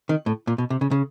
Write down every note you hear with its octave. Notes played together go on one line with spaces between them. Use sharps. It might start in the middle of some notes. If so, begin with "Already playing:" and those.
D#3
A2
A#2
B2
C3
C#3
C#3